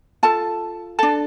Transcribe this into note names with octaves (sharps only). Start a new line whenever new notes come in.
F4 A4 A5
D4 A4 A5